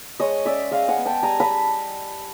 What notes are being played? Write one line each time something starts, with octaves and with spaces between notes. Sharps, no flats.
G#3 C#5 D#5
C#4 D5 E5
G#3 D#5 F5
F#5 G#5
B3
G5 A5
G3 G#5 A#5
A5 B5